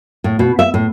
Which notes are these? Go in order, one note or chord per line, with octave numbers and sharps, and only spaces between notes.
A2
B2
E5
A2